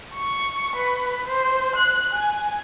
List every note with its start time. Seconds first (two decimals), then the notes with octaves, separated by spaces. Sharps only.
0.14 C#6
0.76 B4
1.26 C5
1.76 F#6
2.13 G#5